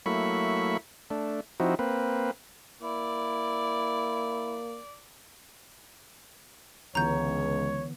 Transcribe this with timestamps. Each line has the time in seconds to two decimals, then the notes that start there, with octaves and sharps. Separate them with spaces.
0.06 F#3 A3 A#3 E4 B5 C#6
1.10 A3 D4
1.60 F3 C4 D#4 E4 F#4
1.79 A#3 C4 B4
2.82 A#3 E4 D5
6.95 C#2 D3 E3 B3 C#5 A#5 G6